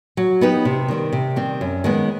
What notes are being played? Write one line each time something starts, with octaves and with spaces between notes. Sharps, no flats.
F#3
B3 D#4 G4 B4
C3
D#3 G3 C4
C3
D#3 G3 C4
F#2
D#3 G#3 B3